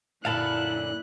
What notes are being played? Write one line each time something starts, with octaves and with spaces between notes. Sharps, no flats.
F#2 A#2 D3 E4 F5 A5 B5 F#6